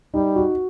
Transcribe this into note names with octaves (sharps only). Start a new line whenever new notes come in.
G3 D#4
F#4